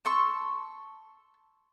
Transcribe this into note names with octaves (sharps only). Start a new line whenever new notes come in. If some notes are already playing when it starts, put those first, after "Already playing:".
A5 C6 C#6 E6